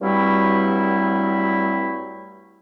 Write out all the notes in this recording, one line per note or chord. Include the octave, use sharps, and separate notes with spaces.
G2 F#3 G3 A3 C4 E4